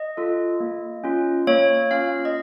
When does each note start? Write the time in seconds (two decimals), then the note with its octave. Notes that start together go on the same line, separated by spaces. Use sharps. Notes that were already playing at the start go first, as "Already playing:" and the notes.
Already playing: D#5
0.17 F4 A4
0.60 A#3
1.04 C#4 F4
1.47 A#3 C#5
1.91 C#4 F4 F5
2.25 D#5